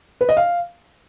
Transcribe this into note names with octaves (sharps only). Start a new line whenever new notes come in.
B4
D#5
F5